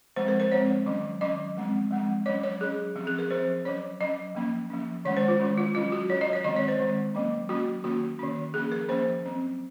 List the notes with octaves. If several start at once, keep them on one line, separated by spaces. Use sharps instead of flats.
F3 G#3 C4 C5
A#4
C5
F3 G#3 C4 C#5
D#3 F#3 C#4
D#3 F#3 C#4 D#5
F3 G#3 C4
F3 G#3 C4
F#3 C#4 C#5
C#5
F#3 C#4 G#4
F3 C4
G#4
A#4
F3 C4 C5
F#3 C#4 C#5
F#3 C#4 D#5
F3 A#3 C#4
F3 A#3 C#4
D#3 G#3 C#4 C#5
C5
F4
D#3 G#3 C#4
F4
F#3 C#4 F4
F#4
F#3 C#4 C#5
D#5
C#5
D#3 G#3 C4 D#5
C#5
C5
D#3 G#3 C4
F#3 A#3 C#4
F#3 A#3 C#4 F#4
D#3 A#3 C#4 F#4
D#3 A#3 C#4
F3 A#3 C#4 G#4
A#4
F3 A#3 C#4 C5
F#3 C4